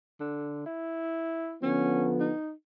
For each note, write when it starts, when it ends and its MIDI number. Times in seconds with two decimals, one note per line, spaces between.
0.20 0.65 50
0.66 1.56 64
1.63 2.31 50
1.63 2.31 53
1.63 2.31 59
1.63 2.10 61
2.20 2.51 63